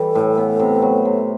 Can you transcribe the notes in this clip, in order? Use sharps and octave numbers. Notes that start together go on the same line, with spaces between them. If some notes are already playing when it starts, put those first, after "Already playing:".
Already playing: E3 G3 A4
A2
B3
C3
F#3
C3